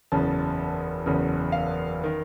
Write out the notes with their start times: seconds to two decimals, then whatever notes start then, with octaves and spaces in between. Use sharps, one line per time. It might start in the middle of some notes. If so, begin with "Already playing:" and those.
0.12 F#1 E2 C#3 A5
1.06 F#1 E2 C#3
1.52 F5
2.04 D#3